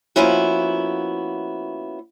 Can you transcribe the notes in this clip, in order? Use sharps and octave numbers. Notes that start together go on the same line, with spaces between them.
F3 A#3 B3 C#4 E4 F#4